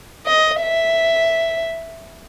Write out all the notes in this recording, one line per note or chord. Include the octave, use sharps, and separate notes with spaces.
D#5
E5